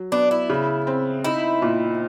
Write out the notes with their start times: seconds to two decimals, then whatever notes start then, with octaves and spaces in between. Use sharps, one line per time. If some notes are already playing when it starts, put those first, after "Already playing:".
Already playing: F#3
0.12 B3 D4
0.31 E4
0.50 C#3
0.87 C4
1.24 D#4 E4
1.62 A#2